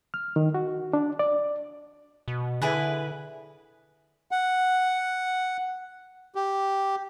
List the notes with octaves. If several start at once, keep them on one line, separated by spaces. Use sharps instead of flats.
F6
D#3
F#4
D4
D5
B2
D3 E4 G#4 B4
F#5
G4